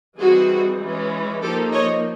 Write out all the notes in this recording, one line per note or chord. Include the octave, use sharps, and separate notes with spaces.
E3 G3 C4 D#4 F#4 G#4
E3 G#3 C#4
F3 A#3 D#4 G4 A4
C#5 D#5